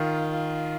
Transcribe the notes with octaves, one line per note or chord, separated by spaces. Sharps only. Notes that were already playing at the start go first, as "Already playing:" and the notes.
Already playing: D#3 F4
F4